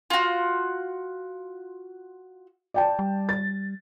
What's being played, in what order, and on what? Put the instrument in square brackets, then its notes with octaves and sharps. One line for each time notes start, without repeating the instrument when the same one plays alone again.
[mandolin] F4 F#4
[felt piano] D5 G5 A5
[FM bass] G3
[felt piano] A6